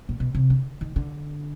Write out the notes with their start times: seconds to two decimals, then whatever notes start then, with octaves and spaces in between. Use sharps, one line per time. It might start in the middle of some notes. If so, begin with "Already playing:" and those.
0.09 A#2
0.20 B2
0.35 C3
0.50 D3
0.81 D#3
0.96 D3